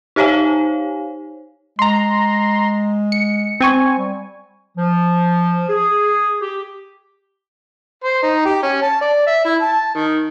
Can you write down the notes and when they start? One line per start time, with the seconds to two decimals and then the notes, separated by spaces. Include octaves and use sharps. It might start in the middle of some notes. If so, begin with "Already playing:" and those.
0.16 D#4 G4 C5 C#5 F5 G#5
1.79 G#3 A#5 C6
3.12 C#7
3.60 C4 G#5 C#6
3.96 G3
4.76 F3
5.69 G#4
6.40 G4
8.04 C5
8.23 D#4
8.46 G4
8.63 C#4
8.82 A5
9.01 D5
9.27 E5
9.45 E4
9.62 A5
9.95 D#3